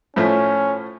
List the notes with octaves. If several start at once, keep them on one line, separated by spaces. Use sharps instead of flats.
A2 F3 A3 C#4